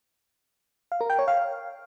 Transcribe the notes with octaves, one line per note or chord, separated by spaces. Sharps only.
F5
A#4
G5
C#5
F5